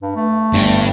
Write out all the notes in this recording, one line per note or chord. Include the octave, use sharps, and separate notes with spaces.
G2
A3
G1 G2